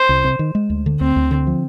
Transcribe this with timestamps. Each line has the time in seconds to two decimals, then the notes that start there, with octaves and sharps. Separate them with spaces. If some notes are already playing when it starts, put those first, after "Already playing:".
Already playing: C5
0.09 C2
0.24 C3
0.39 D#3
0.55 G#3
0.70 D2
0.86 D3
1.01 D2 C4
1.16 D2
1.31 D3
1.47 F3